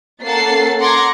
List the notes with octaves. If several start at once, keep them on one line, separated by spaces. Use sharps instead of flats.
A#3 C#4 A4 F#5 A6 C7
F#5 A#5 C6 D6 G#6 A#6